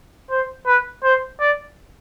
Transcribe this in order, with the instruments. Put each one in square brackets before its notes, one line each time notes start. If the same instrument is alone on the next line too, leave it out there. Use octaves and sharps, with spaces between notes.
[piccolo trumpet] C5
B4
C5
D5